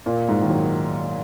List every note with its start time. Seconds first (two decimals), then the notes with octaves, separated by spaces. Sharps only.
0.06 A#2
0.29 G#2
0.42 D#3
0.50 F#3